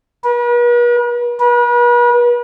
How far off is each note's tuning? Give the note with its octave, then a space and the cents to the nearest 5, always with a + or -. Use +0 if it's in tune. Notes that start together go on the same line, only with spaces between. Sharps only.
B4 -45
B4 -40